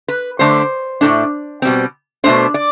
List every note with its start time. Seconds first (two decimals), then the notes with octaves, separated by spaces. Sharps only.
0.08 B4
0.39 D3 A3 D4 C5
1.01 A2 F3 A3 D4
1.62 B2 G3 C4
2.24 B2 A3 D4 C5
2.54 D5